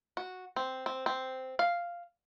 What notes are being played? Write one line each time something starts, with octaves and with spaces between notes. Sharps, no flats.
F#4
C4
C4
C4
F5